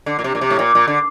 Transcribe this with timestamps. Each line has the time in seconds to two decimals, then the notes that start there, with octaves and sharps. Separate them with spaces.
0.06 D3
0.19 A#2
0.24 C3
0.35 A#2
0.41 C3
0.50 A2
0.59 A#2
0.75 A#2
0.87 D3